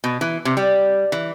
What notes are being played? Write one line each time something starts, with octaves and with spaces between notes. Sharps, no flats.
B2
E3
C3
G3
E3